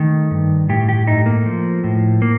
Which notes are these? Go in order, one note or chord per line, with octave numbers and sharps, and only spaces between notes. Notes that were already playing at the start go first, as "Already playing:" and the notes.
Already playing: D#3 A3
G2
A2 G4
G4
A3 D#4
A#3
F3
A2
A#3